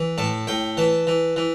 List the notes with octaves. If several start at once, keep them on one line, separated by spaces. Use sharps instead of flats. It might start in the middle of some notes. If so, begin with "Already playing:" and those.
Already playing: E3
A2 A5
A2 G5
E3 A5
E3
E3